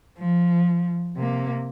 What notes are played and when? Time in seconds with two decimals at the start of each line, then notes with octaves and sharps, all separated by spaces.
0.18 F3
1.17 C3 A#3